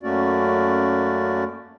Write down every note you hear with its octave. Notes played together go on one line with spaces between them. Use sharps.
F#2 A3 A#3 C#4 F#4 D5